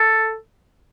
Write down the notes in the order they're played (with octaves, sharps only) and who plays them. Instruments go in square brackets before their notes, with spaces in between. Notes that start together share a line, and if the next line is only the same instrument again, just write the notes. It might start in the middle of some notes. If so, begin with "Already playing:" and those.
Already playing: [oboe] A4